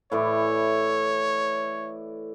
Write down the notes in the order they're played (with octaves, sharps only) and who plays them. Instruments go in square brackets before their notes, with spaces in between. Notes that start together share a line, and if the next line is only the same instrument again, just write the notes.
[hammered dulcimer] A2 E3 D5 [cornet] C#5